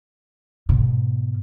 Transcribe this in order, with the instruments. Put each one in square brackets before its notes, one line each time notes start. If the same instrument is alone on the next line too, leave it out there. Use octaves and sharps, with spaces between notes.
[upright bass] G#2 B2